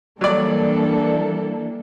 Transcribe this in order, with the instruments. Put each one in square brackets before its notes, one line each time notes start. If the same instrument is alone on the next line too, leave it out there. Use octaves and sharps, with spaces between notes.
[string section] E3 A#3 D4 [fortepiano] F#3 D5 [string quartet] G3 A4